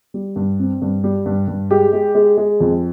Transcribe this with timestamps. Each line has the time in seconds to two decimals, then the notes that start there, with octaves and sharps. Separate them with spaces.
0.14 G3
0.36 G2
0.59 C4
0.82 G2
1.04 G3
1.26 G2
1.48 G2
1.71 G#3 G4
1.93 G#3
2.15 G#3
2.37 G#3
2.60 F2